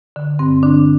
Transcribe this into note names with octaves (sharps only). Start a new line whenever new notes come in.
D3
G2 C4
D3 D4